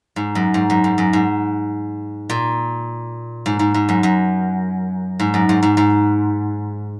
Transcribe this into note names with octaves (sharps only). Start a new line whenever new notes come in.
G#2
F#2
G#2
F#2
G#2
F#2
G#2
A#2
G#2
G#2
G#2
F#2
F#2
G#2
F#2
G#2
G#2
G#2